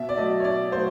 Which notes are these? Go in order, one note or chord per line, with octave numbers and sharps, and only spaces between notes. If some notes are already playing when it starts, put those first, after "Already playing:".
Already playing: B2 E5
D5
F#3 A3 D#5
C#5
B2 D5
F#3 A3 C5